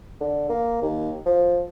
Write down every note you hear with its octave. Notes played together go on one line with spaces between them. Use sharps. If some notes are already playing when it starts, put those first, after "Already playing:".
D3
A#3
D#2
F3